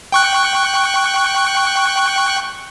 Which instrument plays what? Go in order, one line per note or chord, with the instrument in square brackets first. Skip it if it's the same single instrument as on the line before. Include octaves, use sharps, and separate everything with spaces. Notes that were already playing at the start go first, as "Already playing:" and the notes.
[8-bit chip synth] G5 C#6 F#6